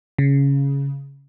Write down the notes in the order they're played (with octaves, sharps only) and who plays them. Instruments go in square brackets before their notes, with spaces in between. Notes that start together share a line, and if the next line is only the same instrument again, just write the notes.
[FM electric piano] C#3